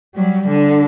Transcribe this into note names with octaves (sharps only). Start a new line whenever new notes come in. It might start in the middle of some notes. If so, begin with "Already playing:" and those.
F#3 G3
D3